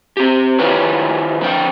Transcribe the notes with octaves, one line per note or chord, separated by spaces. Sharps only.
C4 G4
D#3 E4 F4 G4 B4 C#5
D3 F3 G5